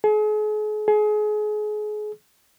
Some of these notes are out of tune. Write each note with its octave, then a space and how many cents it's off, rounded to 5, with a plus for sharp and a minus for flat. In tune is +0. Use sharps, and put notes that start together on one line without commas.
G#4 +40
G#4 +30